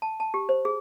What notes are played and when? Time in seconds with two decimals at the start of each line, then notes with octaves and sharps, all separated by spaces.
0.02 A5
0.20 A5
0.34 G4
0.49 C5
0.65 G#4